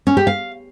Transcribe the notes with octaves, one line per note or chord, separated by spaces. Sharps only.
C#4
G4
F5